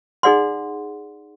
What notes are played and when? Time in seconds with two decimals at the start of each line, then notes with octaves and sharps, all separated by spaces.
0.23 D#4 G#4 D5 F#5 C6